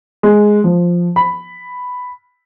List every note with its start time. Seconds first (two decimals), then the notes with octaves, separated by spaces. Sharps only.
0.23 G#3
0.64 F3
1.16 B5